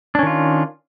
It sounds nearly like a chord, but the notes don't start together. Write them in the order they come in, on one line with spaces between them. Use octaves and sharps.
D4 C#4 D#3 F4